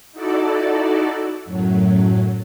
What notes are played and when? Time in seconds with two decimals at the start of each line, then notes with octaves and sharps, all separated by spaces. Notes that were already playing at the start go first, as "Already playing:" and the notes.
0.12 D#4 E4 F#4 A4 D5
1.45 F#2 A2 F#3